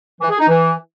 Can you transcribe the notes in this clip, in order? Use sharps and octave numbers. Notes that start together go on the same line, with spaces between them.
E3
G#4
D#4
E3